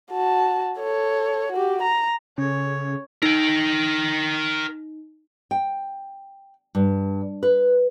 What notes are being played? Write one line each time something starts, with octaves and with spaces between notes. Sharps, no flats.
F#4 A5
A4 C#5
F#4 G4
A#5
C#3 C#4 A4 C#5
D#4 A#4 G5
G5
G2
B4